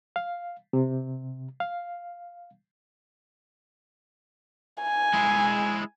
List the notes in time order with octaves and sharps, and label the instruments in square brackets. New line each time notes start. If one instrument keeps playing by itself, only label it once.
[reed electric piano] F5
C3
F5
[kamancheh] G#5
[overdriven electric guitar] G#3 E4